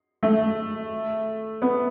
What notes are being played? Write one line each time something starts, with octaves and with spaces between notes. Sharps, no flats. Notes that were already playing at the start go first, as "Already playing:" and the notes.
A3
B3